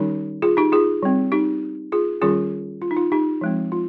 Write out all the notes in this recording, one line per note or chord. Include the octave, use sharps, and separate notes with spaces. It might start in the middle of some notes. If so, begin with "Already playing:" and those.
Already playing: D#3 G3 C#4 D#4 G4
F4 G#4
D#4 G4
F4 G#4
G3 C4
D#4 G4
F4 G#4
D#3 G3 C#4 F4 G#4
F4
D#4
F4
D#4 G4
F3 G#3 C4
F4